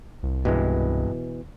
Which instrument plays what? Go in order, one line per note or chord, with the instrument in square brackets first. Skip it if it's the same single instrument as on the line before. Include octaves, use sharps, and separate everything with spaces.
[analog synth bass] C2
[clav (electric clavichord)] G2 G#3 [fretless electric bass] B2 E3